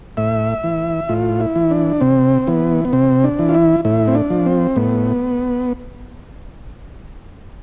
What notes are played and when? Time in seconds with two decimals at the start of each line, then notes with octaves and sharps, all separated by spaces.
0.17 A2 E5
0.64 E3
1.09 A2 F4
1.40 E4
1.56 E3
1.71 D4
2.01 C3 C4
2.47 E3 B3
2.85 B3
2.93 C3 C4
3.24 D4
3.39 E3
3.49 F4
3.54 E4
3.85 A2 E4
4.08 C4
4.15 D4
4.30 F3
4.46 C4
4.76 A2 B3